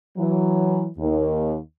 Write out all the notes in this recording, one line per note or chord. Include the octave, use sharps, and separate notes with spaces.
E3 F#3
D#2